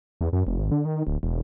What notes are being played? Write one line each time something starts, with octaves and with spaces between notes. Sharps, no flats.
E2
F#2
F1
G#1
D3
D#3
D1
E1